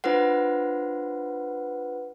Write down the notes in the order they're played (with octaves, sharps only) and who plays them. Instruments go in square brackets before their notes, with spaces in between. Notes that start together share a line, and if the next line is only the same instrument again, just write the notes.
[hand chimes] D4 F4 B4 C5 F#5